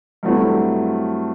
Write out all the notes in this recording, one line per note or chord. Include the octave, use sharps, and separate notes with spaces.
G2 F#3 A3 C4 E4